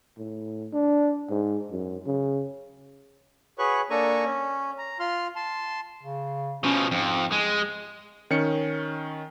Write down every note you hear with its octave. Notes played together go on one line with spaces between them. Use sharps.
A2
D4
G#2
F#2
C#3
F#4 G#4 B4 C#5 C#6 F#6
A#3 D4 A4 G#5 A#5 C#6
C#4
A#5
F4 C6 F6
A5 C6
C#3
B2 F3 C#4
F2 G#2
G#3
D#3 C#4 C#7